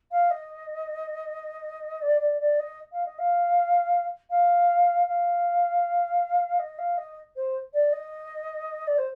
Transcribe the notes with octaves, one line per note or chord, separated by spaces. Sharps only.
F5
D#5
D5
D5
D5
D#5
F5
D#5
F5
F5
F5
D#5
F5
D#5
C5
D5
D#5
D5
C5